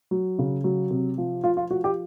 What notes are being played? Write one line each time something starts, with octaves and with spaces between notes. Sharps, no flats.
F#3
C#3
F#3
C3
F3
F3 F4
F4
F3 F#4
G4